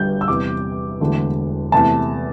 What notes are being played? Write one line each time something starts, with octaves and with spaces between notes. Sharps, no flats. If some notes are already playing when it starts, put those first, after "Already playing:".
Already playing: G1 G2 D3 G3 G6
E6
E2 C3 G3 D6
E1 E2 D3 A3
E2 C3 A3 A5